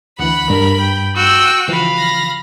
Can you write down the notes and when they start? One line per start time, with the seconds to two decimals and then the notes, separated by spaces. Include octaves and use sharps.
0.19 D2 E3 F#5 B5
0.50 G2 A#4
0.80 G5
1.16 F#4 G5 E6 G6
1.68 C#3 E3 F3 F5 B5
1.98 A#6